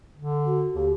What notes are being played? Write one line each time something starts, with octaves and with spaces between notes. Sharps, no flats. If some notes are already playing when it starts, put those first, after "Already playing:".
D3
F#4
D#2 G4